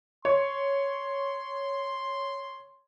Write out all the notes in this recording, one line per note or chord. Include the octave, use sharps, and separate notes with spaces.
C#5 C6